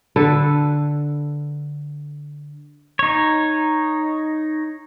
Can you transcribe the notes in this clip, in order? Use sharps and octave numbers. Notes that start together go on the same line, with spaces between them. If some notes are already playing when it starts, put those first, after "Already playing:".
D3 A4 B4
D#4 C#5